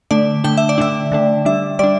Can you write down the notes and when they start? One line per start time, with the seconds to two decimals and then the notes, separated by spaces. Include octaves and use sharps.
0.11 D3 A3 D4 D5
0.44 D3 A3 D4 G5
0.57 E5
0.69 D5
0.78 D3 A3 D4 E5
1.12 D3 A3 D4
1.45 G3 D4 E5
1.79 G3 D4 D5